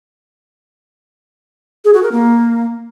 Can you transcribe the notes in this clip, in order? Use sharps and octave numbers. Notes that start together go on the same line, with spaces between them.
G#4
F#4
A#4
A#3